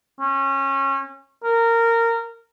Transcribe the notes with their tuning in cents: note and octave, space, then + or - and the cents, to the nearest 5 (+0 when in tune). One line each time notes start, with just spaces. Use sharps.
C#4 -25
A#4 -15